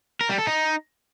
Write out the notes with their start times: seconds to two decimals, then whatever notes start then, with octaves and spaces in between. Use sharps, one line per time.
0.21 A#4
0.29 G3
0.38 A4
0.47 D#4